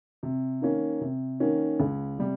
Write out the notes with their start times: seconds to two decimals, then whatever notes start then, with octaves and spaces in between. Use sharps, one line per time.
0.23 C3
0.61 D#3 A#3 C#4
1.01 C3
1.40 D#3 A#3 C#4
1.80 C#2
2.18 C3 G3